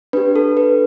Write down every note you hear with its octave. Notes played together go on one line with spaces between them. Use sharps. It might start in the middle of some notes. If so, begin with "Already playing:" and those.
D4 G4 B4
A4
B4